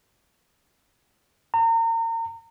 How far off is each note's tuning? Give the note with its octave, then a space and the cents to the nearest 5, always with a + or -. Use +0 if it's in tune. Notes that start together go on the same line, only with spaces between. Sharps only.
A#5 -35